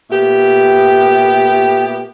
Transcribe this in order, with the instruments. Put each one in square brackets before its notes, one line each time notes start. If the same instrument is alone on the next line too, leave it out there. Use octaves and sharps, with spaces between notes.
[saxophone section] A#2 A3 B3 G4